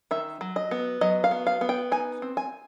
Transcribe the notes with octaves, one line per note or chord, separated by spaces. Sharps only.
D#3 E5
F#3
D#5
B3
F#3 D#5
F5
B3
F5
B3
G5
D#4 G#5
C4
G#5